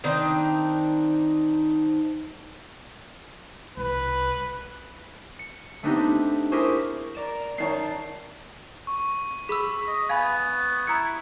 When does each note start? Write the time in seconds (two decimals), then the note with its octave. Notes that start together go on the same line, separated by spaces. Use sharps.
0.04 D#3 C4 D4 D#4
3.77 C2 B4
5.39 C#7
5.83 A3 B3 C4 D4 D#4 G4
6.51 E4 G4 G#4 A#4 C5 C#6
7.15 A#4 D5 E7
7.58 F#2 D#3 C#5 A5 C7
8.87 C#6
9.49 G#4 B5 E6
9.87 D#5
10.09 B3 F5 G#5 B5 G#6
10.87 E4 A#5 C#7